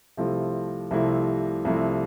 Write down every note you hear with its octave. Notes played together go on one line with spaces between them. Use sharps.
C2 C3 F3 A3 E4
C2 C3 F3 A3 E4
C2 C3 F3 A3 E4